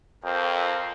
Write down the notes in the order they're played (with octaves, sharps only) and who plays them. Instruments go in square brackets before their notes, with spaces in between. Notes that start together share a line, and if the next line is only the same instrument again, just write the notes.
[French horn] F2 [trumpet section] A#4 C5 G5